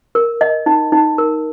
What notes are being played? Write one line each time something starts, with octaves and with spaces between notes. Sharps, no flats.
A#4
D#5
D#4
D#4
A#4